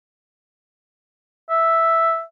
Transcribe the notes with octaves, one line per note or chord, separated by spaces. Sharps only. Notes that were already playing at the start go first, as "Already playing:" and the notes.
E5